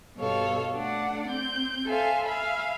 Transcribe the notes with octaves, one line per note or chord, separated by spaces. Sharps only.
G2 B2 A4 C#5 F5
A3 D4 D5 F#5
C4 G6
A4 C5 E5 F5 G#5
E5 F5 G#5 B5